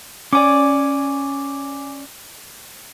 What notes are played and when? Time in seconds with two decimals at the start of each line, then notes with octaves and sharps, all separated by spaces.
0.33 C#4 D5 G#5 D6